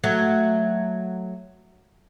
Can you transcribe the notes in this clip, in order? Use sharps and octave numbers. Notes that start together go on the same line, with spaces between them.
F#3 A3